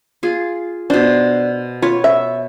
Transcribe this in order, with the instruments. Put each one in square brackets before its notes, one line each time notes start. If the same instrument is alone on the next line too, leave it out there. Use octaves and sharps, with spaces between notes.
[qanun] F4 G#4
[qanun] B2 C5 [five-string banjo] D4
[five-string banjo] F4 [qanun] B4 C#5
[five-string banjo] E5